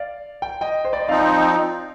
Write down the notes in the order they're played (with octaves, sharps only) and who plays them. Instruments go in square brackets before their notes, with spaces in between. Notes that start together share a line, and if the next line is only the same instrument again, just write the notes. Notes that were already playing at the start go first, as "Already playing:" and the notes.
Already playing: [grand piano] D5 F5
G5
D#5 G5
C5
D5
D#5
[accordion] F3 C4 D#4 [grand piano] D5 F5